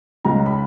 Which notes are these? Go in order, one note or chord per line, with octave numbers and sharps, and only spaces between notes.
C#2 C#3 G#3 A#5
B5